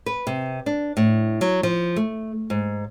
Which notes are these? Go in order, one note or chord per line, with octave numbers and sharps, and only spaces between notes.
B4
C3
D4
A2
F#3
F3
A3
G#2